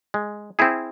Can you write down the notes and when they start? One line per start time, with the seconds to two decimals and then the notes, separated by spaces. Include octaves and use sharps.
0.14 G#3
0.59 C4 E4 G#4